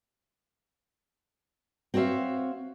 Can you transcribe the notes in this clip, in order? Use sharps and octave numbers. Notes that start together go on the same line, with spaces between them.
C4 F#4 C#5 E5 F5